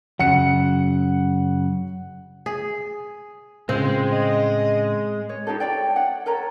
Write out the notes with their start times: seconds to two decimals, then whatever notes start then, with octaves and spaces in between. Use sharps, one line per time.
0.19 F#2 C#3 F#3 F#5 C#7
2.46 G#4
3.69 A2 C#3 G#3 C4 C#4 F4
4.12 D#5
5.29 C#5
5.47 D#4 F4 G4 A4
5.60 C#5 D5 G5
5.96 F#5
6.26 A4 A#4 C#5 A#5